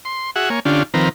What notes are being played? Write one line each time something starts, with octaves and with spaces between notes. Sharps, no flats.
C6
F#4 G#4 E5 F#5
A#3 C#5 G#5
D3 C#4 D4 F4 G4
D#3 F3 C4 A#4 B4